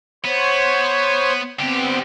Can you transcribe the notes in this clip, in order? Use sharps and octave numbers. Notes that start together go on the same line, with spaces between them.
B3 C5 C#5
D3 B3 C4 G4